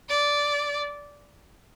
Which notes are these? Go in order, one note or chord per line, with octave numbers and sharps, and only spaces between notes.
D5